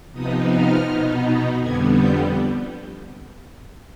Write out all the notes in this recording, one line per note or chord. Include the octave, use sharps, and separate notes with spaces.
C3 F3 B3 D#4 D#6
F6
B2 B3 D#4
F2 D3 G3 B3 G#6
G6